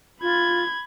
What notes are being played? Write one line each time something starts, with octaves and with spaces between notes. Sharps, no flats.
F4 B5 G#6